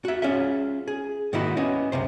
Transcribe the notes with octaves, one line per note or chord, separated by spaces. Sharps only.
F#4 E5
C#4 F4 G#4 E5
G#4
G#2 D#3 A#3 D#4 E4 F#4
B3 C#4 D#5
C#2 F#2 C3 C5